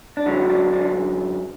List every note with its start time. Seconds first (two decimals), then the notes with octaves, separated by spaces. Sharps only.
0.17 D4
0.26 F#2 D3 F#3 C#4
0.49 D4
0.73 D4